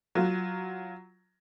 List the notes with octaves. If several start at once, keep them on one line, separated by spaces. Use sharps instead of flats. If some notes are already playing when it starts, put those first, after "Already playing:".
F#3 F4